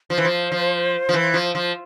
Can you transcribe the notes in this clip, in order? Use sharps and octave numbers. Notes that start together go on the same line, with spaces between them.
F3 C5
E3
F3
F3
F3
E3
F3
F3